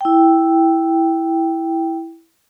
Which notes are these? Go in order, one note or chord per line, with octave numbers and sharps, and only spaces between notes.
E4 G5